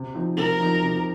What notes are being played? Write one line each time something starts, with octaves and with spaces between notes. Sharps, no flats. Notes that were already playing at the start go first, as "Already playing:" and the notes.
Already playing: C3
F3 C4 D#4
C3 A#4
F3 C4 D#4
C3